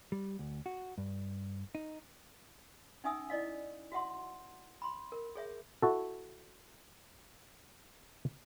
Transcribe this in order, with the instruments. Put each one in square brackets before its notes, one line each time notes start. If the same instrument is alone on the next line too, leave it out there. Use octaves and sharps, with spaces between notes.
[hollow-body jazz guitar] G3
D2
F#4
G2
D#4
[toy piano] C#4 D#4 E5 G#5 D#6 E6
E4 D5 D#5 F5
F#4 E5 F#5 C6
B5 C6
A#4
G#4 C#5 E5
[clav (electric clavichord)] E4 F#4 A4